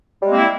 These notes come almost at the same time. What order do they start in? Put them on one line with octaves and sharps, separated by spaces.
G3 G#3 C4 A#3 E4